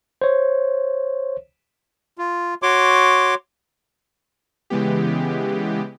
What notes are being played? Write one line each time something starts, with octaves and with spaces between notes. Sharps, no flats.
C5 C#5
F4
F#4 C#5 C6 D6
C#3 E3 G#3 B3 G4